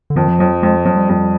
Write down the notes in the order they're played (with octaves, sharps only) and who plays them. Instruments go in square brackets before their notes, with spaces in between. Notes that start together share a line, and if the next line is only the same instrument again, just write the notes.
[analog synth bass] D3
[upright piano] F2 [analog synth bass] D#3
[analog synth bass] F3
[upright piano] F2 [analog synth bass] F#3
[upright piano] F2 [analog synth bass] G#3
[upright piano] F2 [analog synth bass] F#3
[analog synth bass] G3
[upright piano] F2